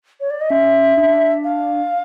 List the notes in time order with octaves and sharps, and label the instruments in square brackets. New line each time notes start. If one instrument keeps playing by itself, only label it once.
[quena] C#5
D5
D#5
[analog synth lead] C#4 [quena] E5
[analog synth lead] D4
[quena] F5